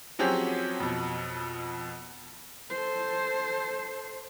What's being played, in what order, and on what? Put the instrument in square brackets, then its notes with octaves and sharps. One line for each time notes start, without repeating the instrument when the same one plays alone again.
[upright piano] F3 F#3 C4 C#4 G4 G#4
F2 B2
[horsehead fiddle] A4 C5